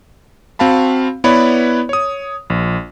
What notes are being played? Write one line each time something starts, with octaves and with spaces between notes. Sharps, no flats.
C4 F#4 F5 A5 B5
B3 E4 B4 C#5 D5 B5
C#5 D#6
A#1